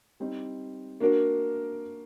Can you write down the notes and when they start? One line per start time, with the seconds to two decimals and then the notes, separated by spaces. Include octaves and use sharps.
0.20 G3 C4 D#4
1.00 A#3 D4 F#4 A#4